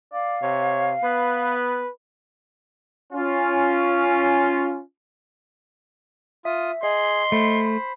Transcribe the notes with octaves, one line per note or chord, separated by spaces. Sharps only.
D5 F5
C3 C#5
B3 B4
C#4 F4
F4 E5 D#6
G#4 D#5 C6
A3 C5 B5